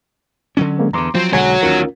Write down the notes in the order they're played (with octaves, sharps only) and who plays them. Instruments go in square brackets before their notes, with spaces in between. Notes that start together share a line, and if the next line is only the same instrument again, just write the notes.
[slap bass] D3 F#3 C#4
[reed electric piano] G#3 A#3 C4
[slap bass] E2 D3 [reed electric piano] A#5 C6 D6
[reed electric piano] F3 [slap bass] F#3 [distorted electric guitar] C4
[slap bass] B1 D3 G#3 [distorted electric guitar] F#4 C#5 [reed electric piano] F#5 G#5
[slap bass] D2 D#3 [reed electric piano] C#4 F4 A#4